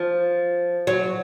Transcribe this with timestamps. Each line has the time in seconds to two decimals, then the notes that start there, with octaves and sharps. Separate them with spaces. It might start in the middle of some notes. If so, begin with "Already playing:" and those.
Already playing: F3
0.87 F#3